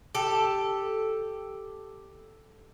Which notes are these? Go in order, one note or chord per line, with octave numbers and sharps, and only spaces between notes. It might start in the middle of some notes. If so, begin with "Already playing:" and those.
G4 A4